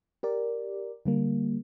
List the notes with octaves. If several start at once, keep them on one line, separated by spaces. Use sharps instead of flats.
G4 A#4 D5
D3 G3 A#3